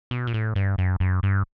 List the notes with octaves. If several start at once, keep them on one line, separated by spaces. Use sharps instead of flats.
B2
A#2
A2
G2
F#2
F#2
G2